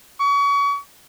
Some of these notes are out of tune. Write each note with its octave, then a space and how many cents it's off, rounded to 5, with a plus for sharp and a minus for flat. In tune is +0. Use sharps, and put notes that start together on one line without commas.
C#6 +35